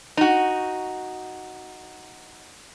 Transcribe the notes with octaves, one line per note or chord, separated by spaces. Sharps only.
D#4 F#4